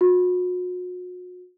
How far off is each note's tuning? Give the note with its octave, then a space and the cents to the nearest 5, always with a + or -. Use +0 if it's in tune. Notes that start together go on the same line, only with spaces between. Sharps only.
F#4 -40